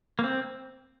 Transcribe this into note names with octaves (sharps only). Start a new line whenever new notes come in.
A#3
C4